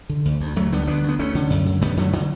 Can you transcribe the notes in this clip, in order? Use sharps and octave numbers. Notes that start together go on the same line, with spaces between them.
D3
D2
D2
D2 F#3 A3
D3 G3 B3
D2 B3 D4
D2
B3
D2 A3 C#4
D3
F#2
D3
F#2 G3 B3
D3 F#3 A3
D3 F#3